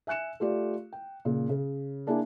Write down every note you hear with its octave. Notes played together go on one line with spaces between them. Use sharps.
E5 G#5 F#6 C#7 E7
A3 F4 G4 D5
G5
A#2 C#3
C#3
A#3 D4 E4 G#4 G#5